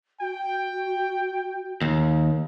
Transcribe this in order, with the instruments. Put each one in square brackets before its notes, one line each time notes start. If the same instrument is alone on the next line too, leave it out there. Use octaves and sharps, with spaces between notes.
[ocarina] F#4 [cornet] G5
[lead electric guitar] D#2